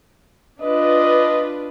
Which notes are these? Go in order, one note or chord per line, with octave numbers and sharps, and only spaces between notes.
D4 F4 B4 D#5